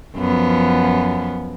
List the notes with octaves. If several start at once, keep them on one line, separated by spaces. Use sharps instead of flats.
F#2 F3 B3